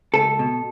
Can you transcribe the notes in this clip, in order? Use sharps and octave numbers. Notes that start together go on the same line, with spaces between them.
C#2 A4
B2